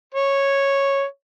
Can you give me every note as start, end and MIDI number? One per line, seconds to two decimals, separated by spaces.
0.14 1.03 73